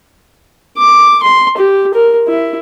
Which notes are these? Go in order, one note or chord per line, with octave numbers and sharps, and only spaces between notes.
D6
C6
G4
A#4
E4